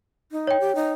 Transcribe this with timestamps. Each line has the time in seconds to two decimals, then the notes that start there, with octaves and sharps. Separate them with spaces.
0.32 D#4
0.47 C#5 G5
0.60 G4
0.75 D#4